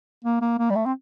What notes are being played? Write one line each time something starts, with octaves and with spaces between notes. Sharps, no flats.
A#3
A#3
A#3
G3
A3
C4